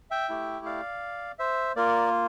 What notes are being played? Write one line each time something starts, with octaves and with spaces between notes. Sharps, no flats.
E5 G5
A3 E4 G4
D5 F5
C5 E5
A#3 F4 A#4 D5